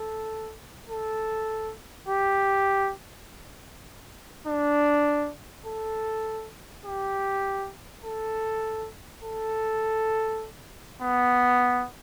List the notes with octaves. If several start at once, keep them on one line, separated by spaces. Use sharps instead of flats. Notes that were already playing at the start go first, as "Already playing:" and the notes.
Already playing: A4
A4
G4
D4
A4
G4
A4
A4
B3